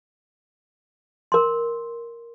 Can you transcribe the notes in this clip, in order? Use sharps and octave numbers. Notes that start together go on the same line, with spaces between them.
A#4 C6